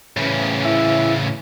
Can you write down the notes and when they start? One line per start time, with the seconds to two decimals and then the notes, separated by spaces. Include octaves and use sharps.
0.17 A2 C#3 E3 C#4
0.64 E4 E5